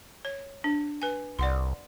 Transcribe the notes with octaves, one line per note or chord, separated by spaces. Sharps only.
C#5
D4
B4 G#5
C2 D5 F#5 C6